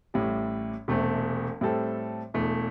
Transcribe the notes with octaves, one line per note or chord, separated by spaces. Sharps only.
A1 A2 G3
E1 E2 C3 A3 C4
A2 G3 C4 A4
E1 E2 E3 A3